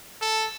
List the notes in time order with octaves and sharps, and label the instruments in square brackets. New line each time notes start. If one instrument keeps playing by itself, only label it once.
[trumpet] A4